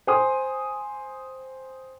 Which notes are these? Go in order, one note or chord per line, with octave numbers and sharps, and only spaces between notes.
C5 G5 G#5 C6 D#6